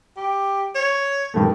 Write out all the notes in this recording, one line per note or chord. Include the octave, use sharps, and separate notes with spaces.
G4
C#5
G2 D#3 A3